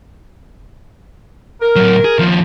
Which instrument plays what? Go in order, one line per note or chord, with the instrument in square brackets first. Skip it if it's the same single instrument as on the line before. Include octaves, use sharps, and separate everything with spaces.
[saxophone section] A#4
[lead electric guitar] A2 F#3
G#4
D#2 F3